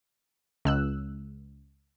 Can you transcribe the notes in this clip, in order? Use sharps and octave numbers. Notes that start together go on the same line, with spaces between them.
C#2 E6 F#6